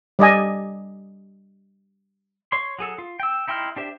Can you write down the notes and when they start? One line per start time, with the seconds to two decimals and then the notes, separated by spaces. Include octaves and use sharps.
0.19 G3 D5 D#5 G#5
2.52 C#5 C6
2.79 F#3 G#4 A4
2.98 F4
3.20 G5 E6
3.48 D#4 E4 G5 C6 F6
3.76 D4 G4 C5 E5